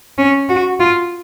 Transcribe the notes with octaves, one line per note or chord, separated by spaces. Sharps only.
C#4
F#4
F4